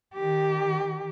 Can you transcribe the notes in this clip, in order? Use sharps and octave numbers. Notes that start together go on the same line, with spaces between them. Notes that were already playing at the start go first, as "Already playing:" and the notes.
D#3 G4